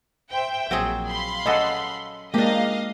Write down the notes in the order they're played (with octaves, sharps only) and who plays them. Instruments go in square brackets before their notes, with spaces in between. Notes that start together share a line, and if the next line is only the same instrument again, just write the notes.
[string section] C5 E5 G5
[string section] A#1 [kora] F#3 C4 G#4
[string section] F5 B5 C6
[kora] C#4 A4 [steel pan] D#5 F#5
[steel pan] G#3 A#3 [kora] D4 G4 [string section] D#5 F5